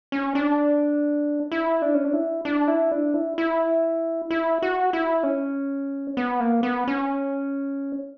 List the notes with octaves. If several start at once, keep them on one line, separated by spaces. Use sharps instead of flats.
C#4
D4
E4
D4
C#4
D4
E4
D4
E4
D4
E4
E4
E4
F#4
E4
C#4
B3
A#3
B3
C#4